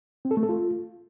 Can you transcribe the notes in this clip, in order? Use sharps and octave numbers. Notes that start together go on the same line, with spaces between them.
C4
A4
A3
A4
F4